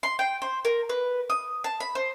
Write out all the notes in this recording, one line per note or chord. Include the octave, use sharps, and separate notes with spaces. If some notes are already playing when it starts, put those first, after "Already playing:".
C6
G5
C5
A#4
B4
D#6
A5
B5
C5